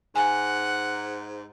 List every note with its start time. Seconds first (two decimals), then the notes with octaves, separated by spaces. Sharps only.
0.16 G#2 F#5 G#5